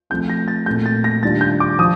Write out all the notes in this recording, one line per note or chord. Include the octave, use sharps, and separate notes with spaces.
F3 A3 C4 F4 G6
A#6
A6
A#2 A3 C4 G6
A6
A#6
D#3 G3 D4 F4 A6
G6
D6
F3 D#6